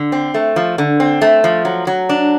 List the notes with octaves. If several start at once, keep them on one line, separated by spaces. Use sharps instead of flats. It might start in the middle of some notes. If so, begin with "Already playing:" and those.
Already playing: D3
C4
A3
F3
D3
C4
A3
F3
F#3
F#3
D4